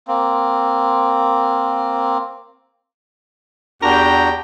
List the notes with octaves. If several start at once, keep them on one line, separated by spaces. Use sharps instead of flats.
A#3 C4
E2 D4 F#4 G4 G5 A#5